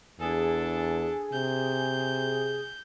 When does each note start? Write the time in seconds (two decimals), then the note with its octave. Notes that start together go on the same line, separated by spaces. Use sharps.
0.20 E2 D4 G#4 A4
1.33 C3 G6